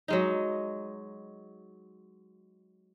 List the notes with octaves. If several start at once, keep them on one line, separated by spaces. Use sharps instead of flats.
F#3 G#3 D#4